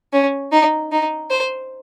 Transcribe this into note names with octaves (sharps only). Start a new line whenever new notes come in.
C#4
D#4
D#4
C5